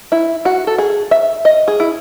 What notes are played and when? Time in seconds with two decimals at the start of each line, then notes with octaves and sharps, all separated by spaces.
0.12 E4
0.45 F#4
0.67 A4
0.78 G#4
1.11 E5
1.45 D#5
1.68 G#4
1.80 E4